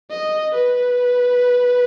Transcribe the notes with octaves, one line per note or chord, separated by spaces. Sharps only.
D#5
B4